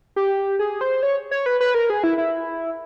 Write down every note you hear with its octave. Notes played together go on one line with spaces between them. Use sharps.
G4
G#4
C5
C#5
C#5
B4
B4
A#4
G#4
E4
E4